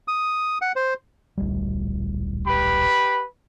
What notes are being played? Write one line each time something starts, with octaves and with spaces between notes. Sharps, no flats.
D#6
F#5
C5
D1 A#1 G3
G4 B4 B5